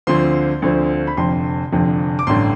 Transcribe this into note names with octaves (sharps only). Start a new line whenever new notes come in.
D2 D3 F3 C4 C6
D2 D3 F3 C4
B5
F1 F2 D3 C6
F1 F2 D3
D6
A1 G2 D3 C6